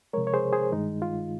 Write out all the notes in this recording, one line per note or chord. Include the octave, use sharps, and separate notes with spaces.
C3 F3 G#3 A#4 C#5
C#5
G#4 C5
G#4 C5
G2 D#3 G#3 D#4
F4